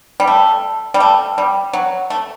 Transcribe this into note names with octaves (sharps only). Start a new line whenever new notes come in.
G3
A3
G3
A3
G3
F#3
A3